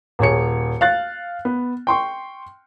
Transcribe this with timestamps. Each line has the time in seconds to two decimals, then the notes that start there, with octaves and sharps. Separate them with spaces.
0.19 D#1 G#4 C#5 C#7
0.81 F5 F#6 A6
1.45 B3
1.87 G5 C6 C#6